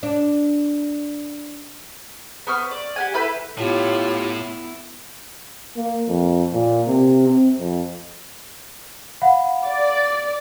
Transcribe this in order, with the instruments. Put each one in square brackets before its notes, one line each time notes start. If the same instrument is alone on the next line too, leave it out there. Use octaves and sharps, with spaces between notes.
[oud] D4
[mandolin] B3 C5 C#6 F6
D5
G4 F#5 G#5
E4 A4 B4 G6
[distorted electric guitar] A2 [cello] B3 E4 [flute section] F4 G4 C#5
[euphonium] A#3
F2
A#2
C3
C4
F2
[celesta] F5 F#5 B5
[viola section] D5